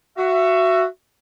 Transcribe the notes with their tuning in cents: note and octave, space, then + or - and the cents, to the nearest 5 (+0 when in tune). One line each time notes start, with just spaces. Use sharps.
F#4 +0 E5 +25